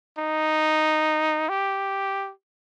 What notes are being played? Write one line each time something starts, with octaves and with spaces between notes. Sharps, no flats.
D#4
G4